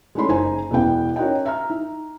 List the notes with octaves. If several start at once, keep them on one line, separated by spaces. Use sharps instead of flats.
G#3 A3 C#4 D#4 B5 C6
F#1 D#4 C5 G#5
E1 E3 B3 G5
C#4 D#4 F#4 A#4 D#5 G5
E5 A#5 F6
D#4